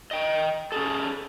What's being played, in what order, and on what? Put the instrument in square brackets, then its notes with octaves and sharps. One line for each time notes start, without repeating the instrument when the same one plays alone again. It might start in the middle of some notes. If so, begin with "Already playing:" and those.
[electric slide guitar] D#5 G5
C#4 G#4 A4